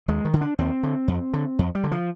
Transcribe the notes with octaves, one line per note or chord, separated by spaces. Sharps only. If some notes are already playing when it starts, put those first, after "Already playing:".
D#2 G#3
D#3
D3
D4
D#2 C4
D3
F2
D3
F2
G3
D3
F3